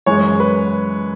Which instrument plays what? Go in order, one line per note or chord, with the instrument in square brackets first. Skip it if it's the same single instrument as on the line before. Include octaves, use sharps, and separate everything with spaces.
[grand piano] F#2 E3 G#3 C#5
B4